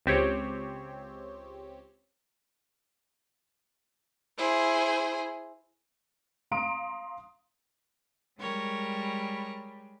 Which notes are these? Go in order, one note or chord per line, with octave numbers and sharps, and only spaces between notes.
C#2 C4 G4 C#5
E4 G#4 C5
F5 A#5 C6 D#6 D7
G3 G#3 A#4 C#5